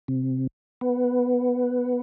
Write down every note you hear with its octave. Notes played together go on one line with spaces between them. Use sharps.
C3
B3